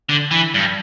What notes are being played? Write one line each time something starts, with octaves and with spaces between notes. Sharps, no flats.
D3
E3
G2